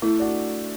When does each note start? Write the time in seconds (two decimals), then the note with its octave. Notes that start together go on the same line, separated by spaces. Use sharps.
0.02 A3 E4
0.19 D4 F#4